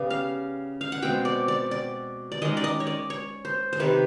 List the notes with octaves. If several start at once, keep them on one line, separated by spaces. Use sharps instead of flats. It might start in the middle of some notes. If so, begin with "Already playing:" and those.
Already playing: C#3 G3 B3 D5
F5
F5
F#5
B2 G#3 C4 G5
D5
D5
D5
D5
D#3 G#3 C#4 D#5
D5
D#5
C#5
D5
C#5
C5
C5
C3 D#3 G3 B4